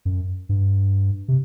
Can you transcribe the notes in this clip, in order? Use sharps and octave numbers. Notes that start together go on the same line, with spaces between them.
F#2
G2
C3